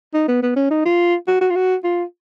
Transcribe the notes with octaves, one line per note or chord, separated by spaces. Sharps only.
D#4
B3
B3
C#4
D#4
F4
F#4
F#4
F4
F#4
F4